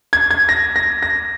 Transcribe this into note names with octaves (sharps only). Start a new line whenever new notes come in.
G#6
G#6
A#6
A#6
A#6